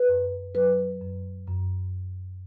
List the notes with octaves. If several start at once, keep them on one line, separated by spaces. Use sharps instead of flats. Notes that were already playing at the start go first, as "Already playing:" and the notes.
Already playing: B4
F#2
F#3 B4
F#2
F#2